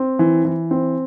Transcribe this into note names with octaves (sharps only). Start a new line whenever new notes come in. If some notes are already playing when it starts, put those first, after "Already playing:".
Already playing: C4
E3
E3
C4